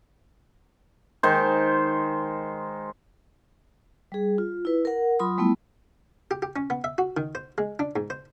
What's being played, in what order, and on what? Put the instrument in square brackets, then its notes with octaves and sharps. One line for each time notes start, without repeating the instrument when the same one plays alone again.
[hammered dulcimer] D#3 G#3 C5
[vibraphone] G3 G#4
F4
E4 B4
A#4 F#5
F#3 F4 B5 C6 D#6
G3 A3 B3 E4
[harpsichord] G4
G4
C#4
B3
E5
F#4
D#3
C5
G#3
D4
G#2
C5